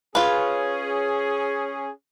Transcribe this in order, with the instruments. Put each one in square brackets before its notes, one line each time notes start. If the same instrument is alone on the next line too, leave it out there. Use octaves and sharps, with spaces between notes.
[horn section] C#4 G#4 [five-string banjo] F4 B4